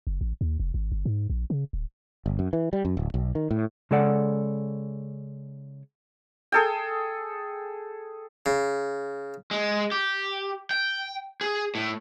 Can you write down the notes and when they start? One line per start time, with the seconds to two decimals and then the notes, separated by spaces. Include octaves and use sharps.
0.07 F#1
0.21 A1
0.41 D#2
0.60 F1
0.74 G#1
0.92 G1
1.05 G#2
1.30 A#1
1.50 C#3
1.73 D1
2.26 G1
2.39 F#2
2.53 E3
2.73 G3
2.85 F#2
2.97 D1
3.14 B1
3.35 D#3
3.51 A2
3.91 C#3 G#3 A4 D5 F#5
6.52 G#4 A4 G5
8.46 C#3
9.51 G#3
9.92 G4
10.71 G5
11.41 G#4
11.75 A2